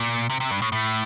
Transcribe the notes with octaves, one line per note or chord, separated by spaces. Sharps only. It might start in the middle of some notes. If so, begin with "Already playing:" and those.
Already playing: A#2
C3
C3
G2
A2
A2